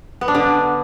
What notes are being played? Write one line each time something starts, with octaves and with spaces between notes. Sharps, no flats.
B3
D4
D3